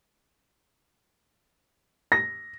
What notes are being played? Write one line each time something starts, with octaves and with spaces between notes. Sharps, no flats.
A#6